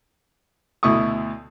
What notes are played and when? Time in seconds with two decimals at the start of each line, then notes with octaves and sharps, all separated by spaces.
0.83 D2 B2 E4 C#6 D#6